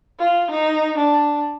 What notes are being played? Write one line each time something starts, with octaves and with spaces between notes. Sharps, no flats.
F4
D#4
D4